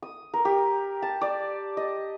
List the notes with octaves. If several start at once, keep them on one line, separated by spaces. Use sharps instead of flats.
D#6
A#4
G4
A5
D5
D#5